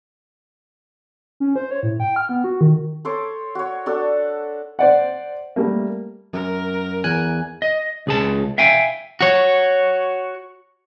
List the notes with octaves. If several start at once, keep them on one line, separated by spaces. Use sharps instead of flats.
C#4
C5
C#5
A2
G5
F6
B3
F#4
D#3
A4 C5 C#5 D6
F#4 C#5
D4 F#4 A4
C5 D5 F#5
G3 A3 A#3
F#2 A#4
E2 G#5 F#6
D#5
C#2 G#4 A5
E5 F5 G5 G#5
F#4 C#5